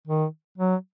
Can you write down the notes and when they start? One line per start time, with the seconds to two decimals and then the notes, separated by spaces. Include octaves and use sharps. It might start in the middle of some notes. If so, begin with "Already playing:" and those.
0.07 D#3
0.58 F#3